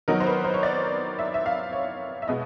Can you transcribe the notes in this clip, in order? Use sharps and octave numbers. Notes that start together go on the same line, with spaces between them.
D#3 F#3 B3 D#4 A#4
C5
B4
C5
C#5
D5
E5
E5
F5
C#5
E5
B2 G#3 B3 D#5